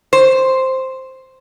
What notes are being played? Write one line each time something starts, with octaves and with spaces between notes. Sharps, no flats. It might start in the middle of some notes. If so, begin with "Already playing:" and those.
C5